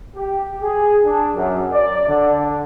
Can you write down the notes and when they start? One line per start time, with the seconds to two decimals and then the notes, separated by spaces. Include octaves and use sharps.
0.16 G4
0.62 G#4
1.04 D4
1.35 F#2
1.72 D5
2.08 D3